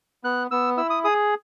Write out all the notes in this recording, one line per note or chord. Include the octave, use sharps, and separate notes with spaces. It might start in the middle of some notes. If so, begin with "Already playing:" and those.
B3 F#6
B3 E6
E4 E6
D#6
G#4 D#6